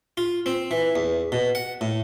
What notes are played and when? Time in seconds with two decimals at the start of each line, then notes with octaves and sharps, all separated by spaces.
0.17 F4
0.46 C4
0.71 E3
0.96 E2
1.32 B2
1.55 F#5
1.81 A2